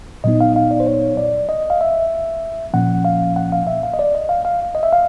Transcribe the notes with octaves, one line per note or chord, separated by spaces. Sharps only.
A#2 F#3 B3 D#4 D#5
F5
F5
D5
C5
C#5
D5
D#5
F5
E5
A#2 F3 A#3 C#4 F#5
F5
F#5
F5
E5
F5
D#5
D5
D#5
F5
F5
D#5
E5
F5